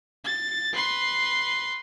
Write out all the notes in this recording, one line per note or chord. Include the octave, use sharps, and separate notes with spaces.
A6
B4 C6